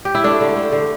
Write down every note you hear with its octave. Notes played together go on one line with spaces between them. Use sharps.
G4
E4
A3 D4
D3
A3
D3